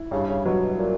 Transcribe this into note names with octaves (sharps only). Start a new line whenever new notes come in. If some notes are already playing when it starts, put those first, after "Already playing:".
Already playing: E4
G2 C#3
C#3
B2 F#3
B2
A#2